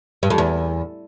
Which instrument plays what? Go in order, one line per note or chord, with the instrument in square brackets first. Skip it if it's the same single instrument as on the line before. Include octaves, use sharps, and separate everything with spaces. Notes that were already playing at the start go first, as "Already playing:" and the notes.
[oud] G2
F2
E2